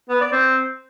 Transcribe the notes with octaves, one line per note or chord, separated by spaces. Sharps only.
B3
D5
C4